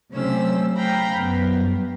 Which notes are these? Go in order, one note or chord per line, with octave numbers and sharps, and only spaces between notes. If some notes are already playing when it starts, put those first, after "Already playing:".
C3 F#3 A3 C#4 C5 E6
F5 G5 A#5 B5
F#2 B3
G2